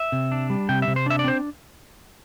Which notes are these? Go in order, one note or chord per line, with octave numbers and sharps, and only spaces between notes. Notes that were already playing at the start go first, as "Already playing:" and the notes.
Already playing: E5
C3
D4
G3
C3 G5
E5
C3
C5
D4 E5
D5
C4 C5